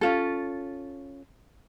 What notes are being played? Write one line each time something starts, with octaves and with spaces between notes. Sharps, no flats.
C#4 F4 A4